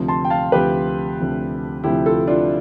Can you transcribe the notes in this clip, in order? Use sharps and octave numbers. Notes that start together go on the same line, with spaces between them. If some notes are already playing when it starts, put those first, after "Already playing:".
Already playing: D2 C3 F3
A5 C6
G5
F5 A5
D2 C3 F3 G4 B4
D2 C3 F3
D2 C3 F3 E4 G4
F4 A4
D4 F4